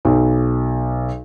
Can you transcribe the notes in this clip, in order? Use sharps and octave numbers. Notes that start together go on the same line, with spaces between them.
B1